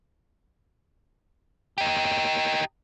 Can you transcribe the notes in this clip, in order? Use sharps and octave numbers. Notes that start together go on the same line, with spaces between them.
D#4 G4